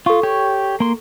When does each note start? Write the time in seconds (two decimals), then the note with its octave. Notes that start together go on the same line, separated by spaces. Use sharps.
0.06 F4 A4 C#6
0.23 G4 C#5
0.80 A#3 C6